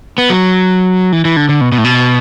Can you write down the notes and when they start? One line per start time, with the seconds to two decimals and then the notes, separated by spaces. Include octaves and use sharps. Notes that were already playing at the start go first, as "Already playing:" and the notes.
0.18 B3
0.30 F#3
1.12 E3
1.25 E3
1.37 D3
1.49 D3
1.61 B2
1.72 B2
1.78 A2
1.84 B2